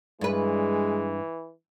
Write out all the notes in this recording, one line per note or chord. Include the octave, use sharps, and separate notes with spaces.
G2 E3 G#3 B4